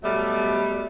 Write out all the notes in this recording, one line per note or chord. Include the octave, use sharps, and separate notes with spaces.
B2 F#3 G3 A3